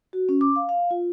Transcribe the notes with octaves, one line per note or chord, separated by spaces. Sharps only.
F#4
C#4
D6
F5
F5
F4